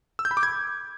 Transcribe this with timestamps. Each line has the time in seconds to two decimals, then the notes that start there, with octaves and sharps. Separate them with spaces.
0.19 E6
0.25 G6
0.31 B5
0.37 D6
0.43 G#6